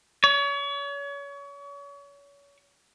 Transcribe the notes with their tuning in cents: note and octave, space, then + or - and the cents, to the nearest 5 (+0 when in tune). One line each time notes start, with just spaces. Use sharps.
C#5 +35